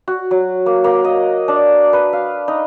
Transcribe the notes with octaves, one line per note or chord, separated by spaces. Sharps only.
F#4
F#3
A#3
A#3
D#5
D4
B4
F5
D#4